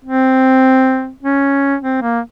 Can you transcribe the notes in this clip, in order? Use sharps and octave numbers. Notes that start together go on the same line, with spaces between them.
C4
C#4
C4
A#3